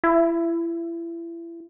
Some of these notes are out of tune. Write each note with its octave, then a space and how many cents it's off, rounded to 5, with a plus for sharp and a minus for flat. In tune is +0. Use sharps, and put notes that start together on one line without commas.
E4 +30